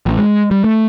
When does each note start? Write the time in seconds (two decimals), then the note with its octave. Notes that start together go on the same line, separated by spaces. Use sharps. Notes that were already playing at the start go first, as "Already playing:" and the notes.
0.06 A1
0.18 G#3
0.51 G3
0.64 A3